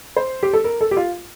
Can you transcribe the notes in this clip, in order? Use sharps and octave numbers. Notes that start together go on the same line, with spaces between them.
C5
G4
A4
A#4
A4
G4
F4